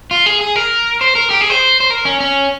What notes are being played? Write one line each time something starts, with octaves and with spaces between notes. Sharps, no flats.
F4
G#4
G#4
A#4
C5
A#4
G4
G#4
C5
C5
A#4
C#4
C#4